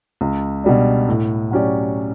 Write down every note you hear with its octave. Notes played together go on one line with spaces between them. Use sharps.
C#2
B2 G3 D4
A2
F#3 C#4 G4 D5